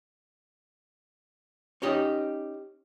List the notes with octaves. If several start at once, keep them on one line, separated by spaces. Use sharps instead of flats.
C#4 D#4 G4 D#5